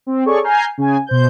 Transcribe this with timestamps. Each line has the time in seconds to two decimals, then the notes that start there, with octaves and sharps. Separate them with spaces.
0.07 C4
0.25 G#4 A4 C#5 D5 C#6
0.43 G#5 A#5 F6 G6 C7
0.78 C#3 G#5
1.06 B2 C5 G6